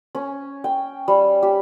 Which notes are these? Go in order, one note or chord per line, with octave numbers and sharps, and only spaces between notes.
C#4
G5
G3
G4